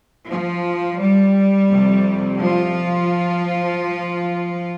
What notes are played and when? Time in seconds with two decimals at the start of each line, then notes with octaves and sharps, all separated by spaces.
0.26 F3
0.98 G3
1.70 F2 C3
2.41 F3 F4